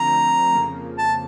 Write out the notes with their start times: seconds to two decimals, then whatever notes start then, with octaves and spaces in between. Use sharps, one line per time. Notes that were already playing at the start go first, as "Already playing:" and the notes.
Already playing: D3 F3 A3 C4 A#5
0.53 F2 C#3 F3 A#3
0.98 A5